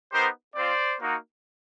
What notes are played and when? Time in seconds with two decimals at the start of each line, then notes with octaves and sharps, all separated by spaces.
0.13 B3 D#4 G4 A#4 C5
0.55 C4 F4 C5 D5
1.00 A#3 D#4 F#4